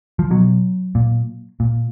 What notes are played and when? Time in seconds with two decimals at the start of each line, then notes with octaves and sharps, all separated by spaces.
0.19 F3
0.31 B2 F#3
0.95 A#2
1.60 A#2